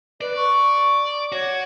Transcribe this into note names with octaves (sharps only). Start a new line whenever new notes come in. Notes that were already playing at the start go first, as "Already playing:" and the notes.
B4 D5
C#6
F#4 C#5